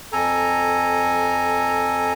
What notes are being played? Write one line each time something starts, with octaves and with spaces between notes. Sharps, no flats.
F2 A4 G#5 A#5